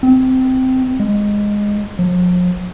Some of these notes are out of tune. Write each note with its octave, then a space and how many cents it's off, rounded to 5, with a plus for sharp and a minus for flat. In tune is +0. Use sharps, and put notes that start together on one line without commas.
C4 -15
G#3 -10
F3 +45